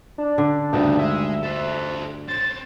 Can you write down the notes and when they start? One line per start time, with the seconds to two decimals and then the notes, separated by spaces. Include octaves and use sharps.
0.18 D4
0.38 D3
0.73 D2 G2 C#3 B3 D#4
0.99 G#3 E5
1.43 A4 C5
2.28 C4 C#4 A6